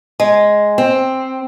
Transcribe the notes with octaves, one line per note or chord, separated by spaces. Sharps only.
G#3
C4